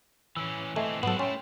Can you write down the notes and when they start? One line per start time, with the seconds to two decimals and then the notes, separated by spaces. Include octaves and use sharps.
0.37 E3 C#4 E6
0.76 E3 A3 C4 D#5 G#5
1.03 G#2 F#3 B3 C4 F#4 A4
1.19 A3 C#4 E4 G5 C6